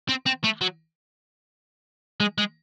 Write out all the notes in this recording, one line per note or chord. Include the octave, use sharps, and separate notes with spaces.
C4
C4
A3
F#3
G#3
G#3